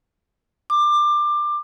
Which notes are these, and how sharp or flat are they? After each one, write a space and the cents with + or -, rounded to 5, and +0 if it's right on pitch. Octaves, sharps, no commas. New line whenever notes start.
D6 +20